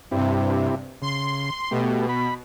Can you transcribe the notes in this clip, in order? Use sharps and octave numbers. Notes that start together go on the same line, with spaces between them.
G2 C3 C4 E4 G4
C#3 C6
B2 A3 B3 G4
B5